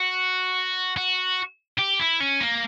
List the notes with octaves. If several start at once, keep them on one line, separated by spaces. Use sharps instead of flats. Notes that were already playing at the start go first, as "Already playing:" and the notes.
Already playing: F#4
F#4
G4
E4
C#4
A#3